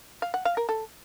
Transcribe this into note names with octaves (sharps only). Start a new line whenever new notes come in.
F5
F#5
F5
A#4
A4